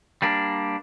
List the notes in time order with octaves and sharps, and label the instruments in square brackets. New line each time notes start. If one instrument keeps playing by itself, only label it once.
[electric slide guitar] G3 A#3 D4